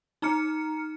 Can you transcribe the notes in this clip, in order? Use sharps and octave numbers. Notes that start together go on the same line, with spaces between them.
D#4 A#5 F6 C#7